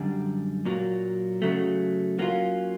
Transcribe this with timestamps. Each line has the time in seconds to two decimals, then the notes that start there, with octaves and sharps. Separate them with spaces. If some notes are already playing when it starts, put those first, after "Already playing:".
Already playing: F#2 D3 G3
0.65 A#2 F#3 A#3
1.42 C#3 F#3 A3
2.19 F#3 A#3 C#4 F4